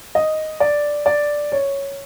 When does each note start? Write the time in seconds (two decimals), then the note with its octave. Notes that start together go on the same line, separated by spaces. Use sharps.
0.15 D#5
0.60 D5
1.06 D5
1.52 C#5